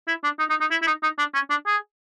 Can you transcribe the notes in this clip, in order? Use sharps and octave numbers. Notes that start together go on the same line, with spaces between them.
E4
D4
D#4
D#4
D#4
E4
E4
D#4
D#4
D4
C#4
D4
G#4